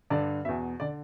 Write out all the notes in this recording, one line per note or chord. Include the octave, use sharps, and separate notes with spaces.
G2 D3 D5
E2 B2 E5
D3 D5